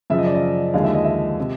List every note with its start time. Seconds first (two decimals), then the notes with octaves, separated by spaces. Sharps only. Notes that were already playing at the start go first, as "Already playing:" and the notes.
0.10 F#2 C#3 F3 E5
0.18 D#5
0.26 D5
0.35 D#5
0.74 D#2 D3 F3 G#3 F5
0.84 E5
0.95 D#5
1.04 E5
1.40 C3